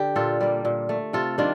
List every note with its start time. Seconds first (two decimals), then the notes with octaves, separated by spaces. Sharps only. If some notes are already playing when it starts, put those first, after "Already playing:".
Already playing: D3 G4
0.16 A#2 F4 A4
0.41 G3 A#3
0.65 A#2
0.89 A3
1.13 C3 F4 A4
1.38 D#3 G3 A#3 D4 F4